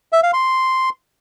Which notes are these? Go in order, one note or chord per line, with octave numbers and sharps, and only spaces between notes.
E5
F5
C6